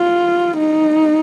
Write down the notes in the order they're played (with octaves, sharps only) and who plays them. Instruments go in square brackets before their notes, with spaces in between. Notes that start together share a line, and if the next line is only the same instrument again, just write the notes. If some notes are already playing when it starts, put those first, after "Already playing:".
Already playing: [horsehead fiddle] F4
D#4